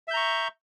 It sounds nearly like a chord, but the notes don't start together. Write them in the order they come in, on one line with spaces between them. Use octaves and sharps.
E5 G6 A#5 C#6